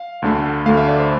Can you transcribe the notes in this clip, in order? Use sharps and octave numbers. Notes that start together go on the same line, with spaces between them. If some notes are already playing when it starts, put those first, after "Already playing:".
Already playing: F5
D2 D3 A3
D2 D3 A3 F5
E5
D5
C5